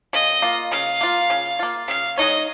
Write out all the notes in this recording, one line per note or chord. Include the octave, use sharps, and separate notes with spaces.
C#3 D#5
A#3 F4
C#3 F5
A#3 F4
C#3
A#3 F4
C#3 F5
G#3 D#4 C#5 D#5